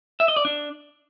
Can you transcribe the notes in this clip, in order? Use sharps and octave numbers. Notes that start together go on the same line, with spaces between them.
E5
D#5
D5
D4